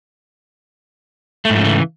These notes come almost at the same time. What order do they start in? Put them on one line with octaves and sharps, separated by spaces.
A3 G#2 F3 C#3 E3